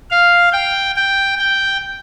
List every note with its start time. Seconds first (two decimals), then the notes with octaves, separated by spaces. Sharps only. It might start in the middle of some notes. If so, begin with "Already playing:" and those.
0.11 F5
0.53 G5
0.96 G5
1.39 G5